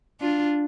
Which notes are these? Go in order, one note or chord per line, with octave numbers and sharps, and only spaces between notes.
D4 F4